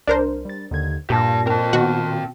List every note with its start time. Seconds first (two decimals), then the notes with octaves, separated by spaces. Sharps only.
0.07 C2 D4 A#4 C5
0.45 G3 A6
0.71 D#2 D3 G#6
1.10 G2 A#2 G4 A5 A#6
1.47 C4 A#4 A5
1.73 B2 D#3 F#4